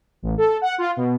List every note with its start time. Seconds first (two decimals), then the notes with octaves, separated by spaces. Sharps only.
0.22 A1
0.38 A4
0.62 F#5
0.78 F4
0.97 B2